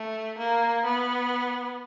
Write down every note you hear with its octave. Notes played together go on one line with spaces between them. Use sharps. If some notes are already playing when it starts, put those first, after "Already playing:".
Already playing: A3
A#3
B3